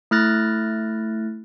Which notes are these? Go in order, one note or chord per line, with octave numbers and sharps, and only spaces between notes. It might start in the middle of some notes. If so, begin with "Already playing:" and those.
A3 E4 F6 F#6 A6 A#6